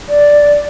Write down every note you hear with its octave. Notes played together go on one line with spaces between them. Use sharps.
D5